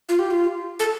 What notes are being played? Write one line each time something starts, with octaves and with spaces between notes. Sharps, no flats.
F4
G4
F4
A4